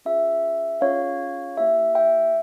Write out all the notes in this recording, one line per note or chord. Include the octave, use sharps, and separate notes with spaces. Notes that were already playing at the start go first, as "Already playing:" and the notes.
C#4 F4 G#4 E5
C#4 F4 G#4 C#5 F5
A#3 E4 G4 E5
E5 G5